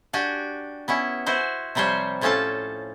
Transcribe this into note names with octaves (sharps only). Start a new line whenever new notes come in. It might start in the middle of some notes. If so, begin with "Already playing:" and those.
D4 F#4 G4 G#5
B3 C#4 E4
E4 F#4 C5
C3 F3 G3 C5 C#5
A2 F3 C#4 F4 A4 A5